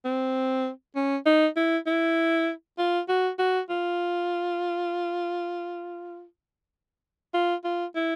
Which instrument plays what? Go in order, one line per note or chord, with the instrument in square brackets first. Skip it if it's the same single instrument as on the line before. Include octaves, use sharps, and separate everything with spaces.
[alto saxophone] C4
C#4
D#4
E4
E4
F4
F#4
F#4
F4
F4
F4
E4